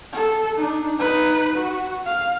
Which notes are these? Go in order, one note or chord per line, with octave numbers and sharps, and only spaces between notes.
A4
D4 D#4
D#4 B4
F#4
F5